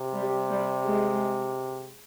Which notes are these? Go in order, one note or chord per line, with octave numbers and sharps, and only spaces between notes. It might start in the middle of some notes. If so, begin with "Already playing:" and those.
Already playing: C3
G3
G3
G#3